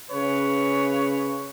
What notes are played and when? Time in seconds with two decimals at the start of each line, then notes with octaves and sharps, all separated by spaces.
0.11 C#3 B4 C#5